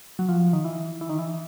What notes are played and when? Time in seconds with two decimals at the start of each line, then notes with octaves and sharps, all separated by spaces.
0.19 F#3
0.29 F3
0.53 D#3
0.65 E3
1.01 E3
1.09 D#3
1.19 E3